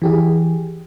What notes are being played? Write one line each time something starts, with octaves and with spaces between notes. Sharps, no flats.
E3 G4 G#4